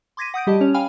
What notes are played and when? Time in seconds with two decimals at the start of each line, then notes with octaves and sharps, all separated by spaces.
0.17 C6 D6 G#6 A#6 B6 D#7
0.34 F#5 D#6 G6 D7
0.47 G3 G4 D#5 A5
0.61 C#4 C#5 F7
0.74 F5 G5 G#5 B5 F6